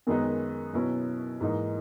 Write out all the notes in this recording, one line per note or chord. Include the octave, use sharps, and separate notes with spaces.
F#2 D#3 G#3 B3 D#4
B2 F#3 C#4 E4 B4
G#2 E3 A#3 D#4